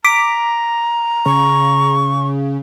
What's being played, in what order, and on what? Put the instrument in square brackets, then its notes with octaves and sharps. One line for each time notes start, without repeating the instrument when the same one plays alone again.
[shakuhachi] A#5 [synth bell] D6 B6 D7
[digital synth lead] C#3 [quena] C#6